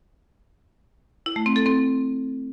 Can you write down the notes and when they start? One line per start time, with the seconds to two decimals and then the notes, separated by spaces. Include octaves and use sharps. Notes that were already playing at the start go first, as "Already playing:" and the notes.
1.26 E4
1.36 A3
1.46 C4
1.56 A4
1.66 C4